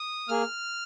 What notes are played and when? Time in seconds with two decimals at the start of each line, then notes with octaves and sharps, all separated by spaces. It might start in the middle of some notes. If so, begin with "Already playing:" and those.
Already playing: D#6
0.28 A#3 G#4 F6